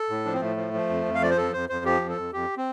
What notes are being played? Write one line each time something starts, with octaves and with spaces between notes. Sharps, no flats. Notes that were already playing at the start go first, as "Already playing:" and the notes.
Already playing: A4
A2
F3 D4
C4
A2 A3
F3
F3
F2
F2
F5
F3 D5
C5
F2 A4
F2 C5
F2 C5
F3 G4
F2
A4
F2
F2 G4
C4